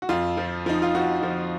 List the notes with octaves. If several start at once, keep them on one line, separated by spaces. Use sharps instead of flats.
F#4
F2 F4
F3
F3 D#4
F4
F3 F#4
F3